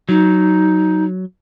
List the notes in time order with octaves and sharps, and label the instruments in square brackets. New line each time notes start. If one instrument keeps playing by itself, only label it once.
[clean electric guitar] F#3 [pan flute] D#4